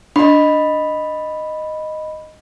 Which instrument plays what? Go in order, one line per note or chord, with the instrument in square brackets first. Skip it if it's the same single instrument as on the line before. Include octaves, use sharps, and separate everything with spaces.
[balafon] D4 [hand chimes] D#5 B5